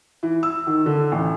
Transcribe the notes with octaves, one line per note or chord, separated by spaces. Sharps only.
E3
E6
D#3
D3
A1